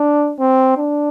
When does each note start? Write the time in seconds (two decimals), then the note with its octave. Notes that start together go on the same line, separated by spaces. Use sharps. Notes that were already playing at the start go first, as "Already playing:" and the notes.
Already playing: D4
0.39 C4
0.78 D4